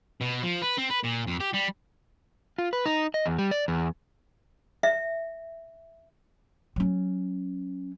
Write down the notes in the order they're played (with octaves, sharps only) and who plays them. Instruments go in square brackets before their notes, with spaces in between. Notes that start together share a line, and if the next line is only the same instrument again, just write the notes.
[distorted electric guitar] B2
F3
B4
C4
B4
A#2
F2
G4
G3
[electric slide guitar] F4
B4
D#4
D#5
E2
G3
D5
E2
[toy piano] E5
[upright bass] F#3 C#4